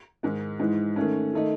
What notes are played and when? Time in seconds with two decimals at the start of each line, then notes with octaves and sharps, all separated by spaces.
0.23 G#2 D#3 G#3
0.59 G#2 E3 G#3
0.96 D#3 A3 C#4
1.34 D#3 A3 D#4